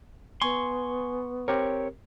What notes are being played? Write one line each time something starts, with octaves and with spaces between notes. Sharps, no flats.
B3 G#5 C6 C#6
C4 G4 A#4 C#5